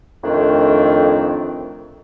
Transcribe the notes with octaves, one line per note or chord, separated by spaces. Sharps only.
F2 A2 D#3 A3 C4 D4